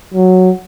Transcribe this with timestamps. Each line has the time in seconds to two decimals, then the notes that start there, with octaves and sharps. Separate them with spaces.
0.14 F#3